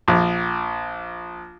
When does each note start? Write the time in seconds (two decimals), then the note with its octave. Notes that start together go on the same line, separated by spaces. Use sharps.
0.08 A#1